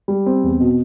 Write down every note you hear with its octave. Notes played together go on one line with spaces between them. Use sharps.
G3
C4
E2
B2